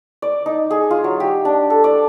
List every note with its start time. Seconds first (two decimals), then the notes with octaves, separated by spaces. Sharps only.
0.22 D5
0.46 D#4
0.71 G#4
0.91 F4
1.04 F#3
1.20 G4
1.45 D4
1.70 A4
1.84 D5